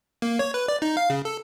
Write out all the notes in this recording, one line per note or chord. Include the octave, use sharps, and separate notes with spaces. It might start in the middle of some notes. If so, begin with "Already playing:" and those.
A#3
C#5
B4
D5
D#4
F5
C#3
A4